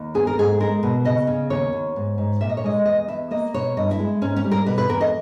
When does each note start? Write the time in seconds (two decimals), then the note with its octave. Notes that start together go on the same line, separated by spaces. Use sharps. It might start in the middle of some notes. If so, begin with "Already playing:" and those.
Already playing: D#2
0.14 B3 G#4
0.27 A#4
0.38 G#2 G#4
0.60 G#3 A#4
0.83 B2
1.05 C#3 D#5
1.27 C#3
1.50 D#2 C#5
1.73 D#2
1.96 G#2
2.18 G#2
2.41 A#2 E5
2.49 D#5
2.57 C#5
2.64 G#3 D#5
2.85 E2 D#5
3.08 E2 E5
3.31 A#3 D#5
3.54 B2 C#5
3.77 G2 D#5
3.91 E4
3.99 G#3
4.21 G#2 C#4
4.36 C#4
4.44 G3
4.52 A#4
4.66 B2 B4
4.78 B4
4.89 E2 A#4
5.01 D#5